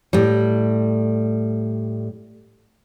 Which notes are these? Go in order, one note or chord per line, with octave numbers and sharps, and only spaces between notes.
A2 G3